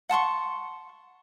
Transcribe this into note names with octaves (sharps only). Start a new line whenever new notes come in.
F#5 A5 C6 C#6